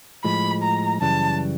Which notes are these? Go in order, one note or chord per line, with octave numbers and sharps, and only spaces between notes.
A2 F3 G#3 B5
A#5
F#2 C#3 E3 G3 A5